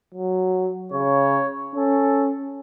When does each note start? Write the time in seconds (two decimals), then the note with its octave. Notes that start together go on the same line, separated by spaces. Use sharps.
0.14 F#3
0.92 C#3 C#5
1.75 C#4 A4